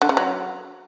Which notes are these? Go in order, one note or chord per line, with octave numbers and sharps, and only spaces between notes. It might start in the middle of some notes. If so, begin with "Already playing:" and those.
D3
C#3
F#3